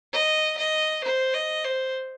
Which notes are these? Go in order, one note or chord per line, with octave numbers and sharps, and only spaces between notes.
D#5
D#5
C5
D#5
C5